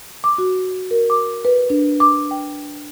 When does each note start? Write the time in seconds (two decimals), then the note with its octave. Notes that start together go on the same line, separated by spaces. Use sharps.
0.24 D6
0.38 F#4
0.91 A#4
1.10 D6
1.45 B4
1.70 D4
2.00 D6
2.31 G5